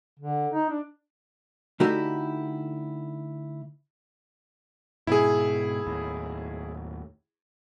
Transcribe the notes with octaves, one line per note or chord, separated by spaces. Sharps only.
D3
D#4
D4
D3 A3 D#4 E4 F#4 G4
G#2 B2 E4 G#4
D#2 A2